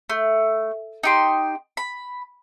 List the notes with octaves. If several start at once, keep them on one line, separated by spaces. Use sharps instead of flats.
A3
D#4 G4 C6
B5